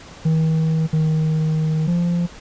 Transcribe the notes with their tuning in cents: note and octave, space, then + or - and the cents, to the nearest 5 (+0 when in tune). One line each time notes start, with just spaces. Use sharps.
D#3 +45
D#3 +15
F3 -15